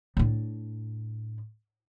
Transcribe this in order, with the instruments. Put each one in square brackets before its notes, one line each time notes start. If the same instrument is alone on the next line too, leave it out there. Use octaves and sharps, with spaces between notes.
[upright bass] A2 D4